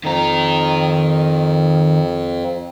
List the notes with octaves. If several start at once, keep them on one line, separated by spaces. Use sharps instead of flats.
F2 D#3 A#5